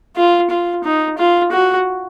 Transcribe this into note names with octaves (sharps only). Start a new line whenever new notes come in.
F4
F4
D#4
F4
F#4